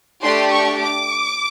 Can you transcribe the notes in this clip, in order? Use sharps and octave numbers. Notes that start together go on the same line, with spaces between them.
A3 D4 G4 C6
C#6
D6